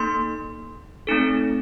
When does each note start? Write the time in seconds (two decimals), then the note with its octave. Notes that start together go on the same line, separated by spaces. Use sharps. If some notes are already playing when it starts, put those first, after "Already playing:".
Already playing: A#3 D#4 A4 C6
1.07 A3 C4 D#4 A4